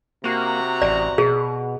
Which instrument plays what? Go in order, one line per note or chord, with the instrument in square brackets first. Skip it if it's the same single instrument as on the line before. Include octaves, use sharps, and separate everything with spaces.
[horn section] C3 F#4 A#5 [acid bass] A#3
[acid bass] A1 [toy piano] D5
[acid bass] B2 [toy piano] G#4